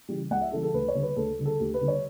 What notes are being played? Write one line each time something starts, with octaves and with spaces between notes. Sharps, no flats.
C#3 E3 G3
C#2 F#5
E5
C#3 E3 G3 A4
A4
D2 B4
C#5
D3 G3
B4
D2 A4
D3 G3
A4
D2 G4
B4
D3 G3
C#5